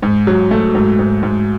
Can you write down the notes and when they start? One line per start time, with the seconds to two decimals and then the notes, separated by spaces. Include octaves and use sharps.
0.02 G#2
0.27 F#3
0.51 A3
0.75 G#2
0.99 G#2
1.23 G#2